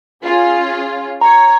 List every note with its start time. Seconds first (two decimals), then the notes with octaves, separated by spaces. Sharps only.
0.23 C#4 F4 G#4
1.21 C#5 A#5